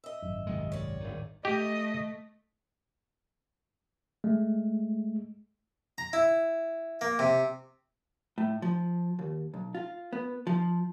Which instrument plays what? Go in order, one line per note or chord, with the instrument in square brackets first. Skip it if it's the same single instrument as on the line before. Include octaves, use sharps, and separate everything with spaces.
[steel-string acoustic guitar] D#5 E5
[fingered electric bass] G#1 F#2
[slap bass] C2 D#3 G#3
[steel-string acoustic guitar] C#5 D5
[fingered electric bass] D1 G2 [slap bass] G#1 D#3
[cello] A3 [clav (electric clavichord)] G4 [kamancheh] D#5
[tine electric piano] G#3 A3
[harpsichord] A#5
E4
A#3
C3
[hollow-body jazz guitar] A2
F3
D#2
B1
F4
B3
F3